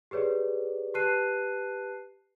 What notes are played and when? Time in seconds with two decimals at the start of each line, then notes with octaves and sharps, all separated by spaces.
0.11 G4 G#4 B4 C#5 D5
0.94 G4 B4 A5 F#6 C7 D#7